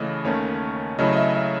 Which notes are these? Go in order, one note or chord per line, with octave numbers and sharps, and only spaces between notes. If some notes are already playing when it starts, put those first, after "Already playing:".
Already playing: C#3 E3 A3 D#5
D#2 D#3 A3 C#4 C#5
C#3 F#3 A3 E4 D#5
D#5
E5
E5